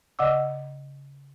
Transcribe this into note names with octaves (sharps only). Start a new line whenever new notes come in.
C#3 D5 D#5 F#5 D6 E6